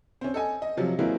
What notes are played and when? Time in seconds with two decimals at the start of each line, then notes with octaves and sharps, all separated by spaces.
0.21 C4 C#4
0.34 A4 D#5 G#5
0.62 D#5
0.77 C3 F3 F#3
0.99 E3 F#3 G#3 A#3 C4 E4